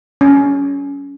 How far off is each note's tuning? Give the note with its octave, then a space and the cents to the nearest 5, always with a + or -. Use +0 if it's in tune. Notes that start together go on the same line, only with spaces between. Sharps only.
C#4 +20